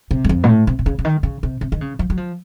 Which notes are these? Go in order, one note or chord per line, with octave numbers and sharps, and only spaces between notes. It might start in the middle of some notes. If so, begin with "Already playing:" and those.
C3
F#2
F2
A#2
A2
C3
C3
C#3
C#3
D#3
C#3
C3
C3
D#3
C#3
F3
F#3
F3